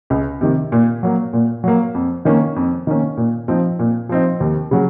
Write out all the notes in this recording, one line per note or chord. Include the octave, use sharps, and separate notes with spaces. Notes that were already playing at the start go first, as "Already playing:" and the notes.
C#2
C3 D#3
A#2
F#3 A#3
A#2
F#3 A#3
F2
D#3 A#3 C#4
F2
D#3 A#3 C#4
A#2
F3 C4 D#4
A#2
F3 C4 D#4
D#2
C#3 F#3